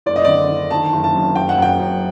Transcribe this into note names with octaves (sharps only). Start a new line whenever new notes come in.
F#1 D5
D#5
D3 D5
D3
D#3 A5
F#1
A5
F#2
F#1 G5
F#5
F#2 G5
F#2